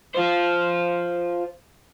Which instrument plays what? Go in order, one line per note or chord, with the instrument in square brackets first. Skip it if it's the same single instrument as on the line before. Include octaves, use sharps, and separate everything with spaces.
[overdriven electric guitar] F4 C5